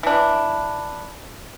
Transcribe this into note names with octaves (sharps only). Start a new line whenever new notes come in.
E3 D4